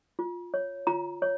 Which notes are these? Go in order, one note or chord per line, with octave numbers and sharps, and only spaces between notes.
F4
C#5
F4 A#5
C#5